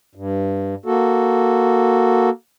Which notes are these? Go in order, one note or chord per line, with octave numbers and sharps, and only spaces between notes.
G2
A#3 F#4 A4